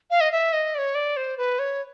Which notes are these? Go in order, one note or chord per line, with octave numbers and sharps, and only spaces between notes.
F5
D#5
E5
D#5
D5
C#5
D5
C5
B4
C#5